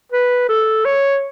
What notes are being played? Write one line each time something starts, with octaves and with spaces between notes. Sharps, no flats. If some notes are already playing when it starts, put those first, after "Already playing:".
B4
A4
C#5